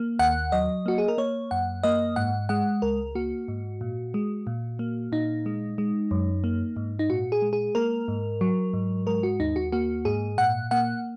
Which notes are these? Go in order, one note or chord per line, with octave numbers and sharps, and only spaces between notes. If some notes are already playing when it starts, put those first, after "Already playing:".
Already playing: A#3
D#2 F#5
F#3 D#5
A#3 F#4
G#4
A#4
A#3 C#5
F#2 F#5
A#3 D#5
G#2 F#5
G#3 F#5
C#2 A#4
A#3 F#4
G#2
A#2
G#3
A#2
A#3
A#2 D#4
G#3
G#3
F#2
A#3
G#2
D#4
A#2 F#4
G#4
G#3
G#4
A#3 A#4
G#2
F#3
G#2
G#3 A#4
F#4
D#2 D#4
F#4
A#3 F#4
G#2 G#4
A#2 F#5
A#3 F#5